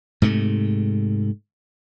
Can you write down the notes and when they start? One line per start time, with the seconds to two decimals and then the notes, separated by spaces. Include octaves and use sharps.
0.22 G#2 C3 A3